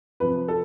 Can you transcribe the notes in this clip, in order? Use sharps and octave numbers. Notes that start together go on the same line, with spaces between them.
C3 F3 B4
A4